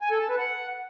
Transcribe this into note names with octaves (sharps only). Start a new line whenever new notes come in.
G#5
A4
A5
B4
F#5